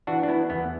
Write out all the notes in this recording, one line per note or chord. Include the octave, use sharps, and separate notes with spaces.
E3 D4 F#4
D4
B3 E4
E2 B3